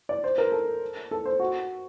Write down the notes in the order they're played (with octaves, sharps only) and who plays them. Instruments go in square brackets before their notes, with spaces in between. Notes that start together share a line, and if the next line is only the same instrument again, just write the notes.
[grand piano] D5
C5
A#4
A4
A4
C5
F#4